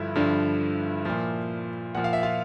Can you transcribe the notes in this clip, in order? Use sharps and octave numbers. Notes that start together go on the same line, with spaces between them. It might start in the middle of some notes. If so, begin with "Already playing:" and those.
Already playing: G2 D3 F3 E4
G2 D3 F3
A#2 F3
A#2 F3 F#5
F5
E5
F4 F5